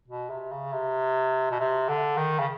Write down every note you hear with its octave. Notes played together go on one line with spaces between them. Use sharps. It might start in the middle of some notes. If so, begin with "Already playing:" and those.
B2
C3
C#3
C3
B2
C3
D3
D#3
C#3